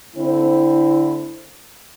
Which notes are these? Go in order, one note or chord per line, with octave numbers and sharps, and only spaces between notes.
D3 A3 C4 E4